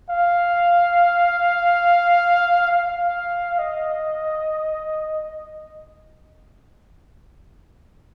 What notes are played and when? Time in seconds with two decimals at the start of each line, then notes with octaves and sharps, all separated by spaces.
0.10 F5
2.71 F5
3.59 D#5